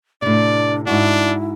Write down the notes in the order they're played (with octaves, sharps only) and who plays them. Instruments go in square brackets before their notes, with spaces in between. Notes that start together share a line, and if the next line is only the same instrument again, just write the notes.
[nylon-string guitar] A2 C3 [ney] D4 [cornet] D5
[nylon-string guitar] G#2 F#4 [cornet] D4 [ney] E4